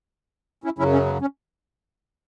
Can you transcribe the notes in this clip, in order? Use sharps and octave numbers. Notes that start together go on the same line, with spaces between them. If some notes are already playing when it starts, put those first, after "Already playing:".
C#4 E4
F#2 C#3 F#3 C#4 E4
C#4
B3
C#4